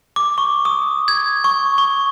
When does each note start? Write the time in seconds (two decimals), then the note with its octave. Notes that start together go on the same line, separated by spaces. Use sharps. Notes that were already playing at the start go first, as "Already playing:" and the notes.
0.16 D6
0.38 C#6
0.65 D#6
1.08 G#6
1.44 C#6
1.78 C#6